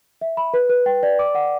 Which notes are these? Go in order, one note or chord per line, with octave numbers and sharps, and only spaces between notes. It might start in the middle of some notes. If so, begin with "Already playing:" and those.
E5
B5
B4
B4
G5
D5
D6
F#5